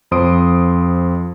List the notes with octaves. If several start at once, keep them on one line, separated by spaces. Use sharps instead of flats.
F2 C5 C6 D#6 D7